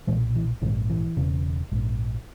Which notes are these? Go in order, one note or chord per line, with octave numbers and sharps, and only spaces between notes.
B1 A#2 E3 G#3
E3
A#1 G#2 D#3
E3
E1 E2 C#3
A#1 G#2